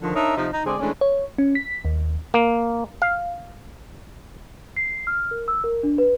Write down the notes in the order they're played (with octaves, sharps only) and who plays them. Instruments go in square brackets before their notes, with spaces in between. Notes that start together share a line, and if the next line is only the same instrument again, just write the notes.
[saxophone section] D3 D#3 F3
D4 D#4 A#4 C#5 E5
C3 F3 D#4
D#4
D3 G#3 C4 G#4 D5
E3 G#3 A3 C#4 D4
[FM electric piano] C#5
C#4
B6
D#2
[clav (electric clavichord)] A#3
F5
[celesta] C7
F6
A#4
E6
A#4
D4
B4